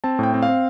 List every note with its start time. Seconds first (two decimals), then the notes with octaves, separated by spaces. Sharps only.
0.04 C4 A5
0.19 A2 G5
0.34 C4
0.42 F5
0.48 C4